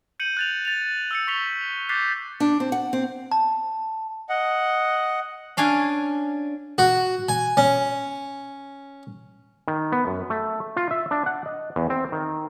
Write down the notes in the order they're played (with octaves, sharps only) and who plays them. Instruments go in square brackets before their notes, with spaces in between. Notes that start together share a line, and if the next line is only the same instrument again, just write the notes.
[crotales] G6 C#7 D#7 F#7
F#6 A6 F7
A6 F7
E6 F#6 A6 C#7
C#6 E6 B6 C#7 F7 G7
D6 F#6 G6 A6 B6 C7
[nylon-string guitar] D4
C4
F#5
C4
[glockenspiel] A5
[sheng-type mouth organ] D#5 F#5
[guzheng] C#4 D4 F5 G#5
[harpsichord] F#4
G#5
C#4
[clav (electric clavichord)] D#3
B3
F#2
A3
F4
E5
D4
F#5
D#5
E2
C4
D#3